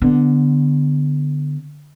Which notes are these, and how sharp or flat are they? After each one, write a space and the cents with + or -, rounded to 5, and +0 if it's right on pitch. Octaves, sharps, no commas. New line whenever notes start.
D3 +0 B3 +5